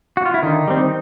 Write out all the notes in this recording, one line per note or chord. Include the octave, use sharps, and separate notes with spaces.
F#4
F4
E4
D3 D#3 D#4
G3 C4